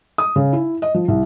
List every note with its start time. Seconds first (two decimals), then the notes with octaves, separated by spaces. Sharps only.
0.18 D#6
0.36 C#3
0.53 E4
0.82 D#5
0.94 F3
1.08 C2